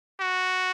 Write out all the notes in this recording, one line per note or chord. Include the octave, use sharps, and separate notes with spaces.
F#4